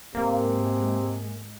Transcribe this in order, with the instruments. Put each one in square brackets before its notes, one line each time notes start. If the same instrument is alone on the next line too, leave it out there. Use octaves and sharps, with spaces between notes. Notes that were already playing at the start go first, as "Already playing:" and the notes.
[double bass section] G#2 G#3 [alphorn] C3 [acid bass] A#3